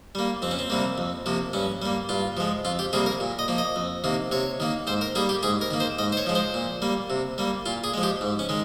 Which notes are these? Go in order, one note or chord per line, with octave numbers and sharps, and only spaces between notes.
G3 A#3
F2 C4
C#4
C4
C3 G3 A#3
F2
C3 F3 A#3
G2 C#4
G3 A#3
G2 F4
F3 G#3
F2 F4
G4
C3 G3 A#3 G#4
A#4
A#2
D#5
F3 A#3
D#5
F2
C3 D#3 A#3
C3 C#5
D#3 A#3
G#2 C5
A#4
G3 A#3 G#4
G4
G#2 G#4
A#4
D#3 A#3
C5
G#2 D#5
C5
C#5
F3 G#3
C5
A#2
G3 A#3
C3
G3 A#3
A#2 F4
G#4
F3 G#3
G4
G#2
C#4
D#3 G#3